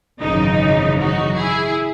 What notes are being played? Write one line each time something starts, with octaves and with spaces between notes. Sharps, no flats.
G#1 F#2 C#3 E3 D#4
D#4 F#4
E4 G#4